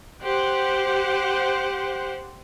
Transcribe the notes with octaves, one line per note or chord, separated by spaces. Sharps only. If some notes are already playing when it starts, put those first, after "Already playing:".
G4 C5 F#5